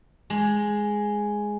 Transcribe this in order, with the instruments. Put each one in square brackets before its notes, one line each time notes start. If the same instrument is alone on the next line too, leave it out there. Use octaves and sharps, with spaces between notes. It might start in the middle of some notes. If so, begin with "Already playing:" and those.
[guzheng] G#3